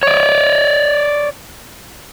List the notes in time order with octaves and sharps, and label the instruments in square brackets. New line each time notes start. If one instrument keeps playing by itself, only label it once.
[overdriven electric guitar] C#5 D5